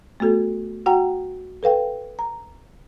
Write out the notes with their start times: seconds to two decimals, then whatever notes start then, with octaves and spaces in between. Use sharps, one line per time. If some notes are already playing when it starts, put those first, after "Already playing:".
0.20 A3 B3 F#4 A4
0.86 F#4 F#5 G5 A#5
1.63 A4 B4 F5 G5
2.19 A#5